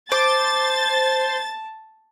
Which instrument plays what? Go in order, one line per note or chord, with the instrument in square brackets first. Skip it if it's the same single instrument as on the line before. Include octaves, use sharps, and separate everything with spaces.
[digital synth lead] C5 [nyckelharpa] A5 [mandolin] D6 [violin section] A6